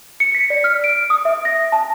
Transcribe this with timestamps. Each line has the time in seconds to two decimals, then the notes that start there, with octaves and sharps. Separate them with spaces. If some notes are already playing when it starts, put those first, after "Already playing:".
0.20 C#7
0.35 B6
0.50 D5
0.64 F6
0.84 D7
1.10 D#6
1.25 E5
1.45 A#6
1.72 A5